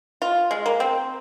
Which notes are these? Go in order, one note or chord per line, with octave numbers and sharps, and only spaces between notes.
F4
G#3
A#3
C4